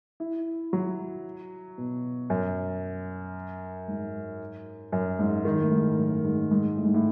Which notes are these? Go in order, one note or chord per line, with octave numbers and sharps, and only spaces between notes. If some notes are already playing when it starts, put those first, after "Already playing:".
E4
F#3
B2
F#2
G#2
F#2
G#2
D#3
A2
G#2
F#2
G#2
G#2
A2
G#2
A2